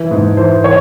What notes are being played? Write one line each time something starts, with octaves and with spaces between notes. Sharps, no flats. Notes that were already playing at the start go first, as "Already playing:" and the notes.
Already playing: E3
G#2
E3 C5
E3 C#5